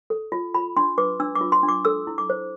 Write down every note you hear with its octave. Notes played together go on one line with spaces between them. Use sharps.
A4
F4
F4 B5
D4 C6
B4 D6
D4 E6
D6
F4
C6
D4
D6
A4 E6
E4
D6
C5